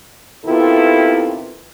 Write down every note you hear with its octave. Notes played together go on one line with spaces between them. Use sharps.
C3 D#3 B3 E4 F4 A4